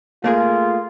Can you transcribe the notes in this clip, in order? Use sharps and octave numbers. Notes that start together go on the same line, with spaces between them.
A3 A#3 F4 G#4